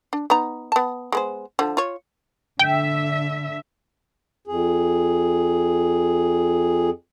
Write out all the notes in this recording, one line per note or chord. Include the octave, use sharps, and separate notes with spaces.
D4
B3 D#4 A#5
B3 A5
G#3 B3 C5
D3 F3
F4 C#5
D3 E5 G5
F2 G#4